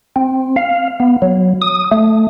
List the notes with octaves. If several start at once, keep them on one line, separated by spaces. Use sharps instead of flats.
C4
F5
B3
F#3
D#6
A3